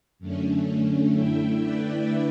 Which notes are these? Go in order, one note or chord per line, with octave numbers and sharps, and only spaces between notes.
F#2 D3 A3 C#4
D3 A3 E4 E5 G5
B4 D5